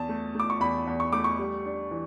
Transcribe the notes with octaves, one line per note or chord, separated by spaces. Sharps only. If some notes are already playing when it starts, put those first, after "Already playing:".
Already playing: E2 A5
A3
A3 D6
C#6
E2 B5
E2
C#6
A3 D6
C#6
G3
D4
E3